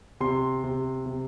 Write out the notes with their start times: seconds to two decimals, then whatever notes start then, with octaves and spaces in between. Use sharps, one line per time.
0.20 C3 C6
0.64 C3
1.06 C3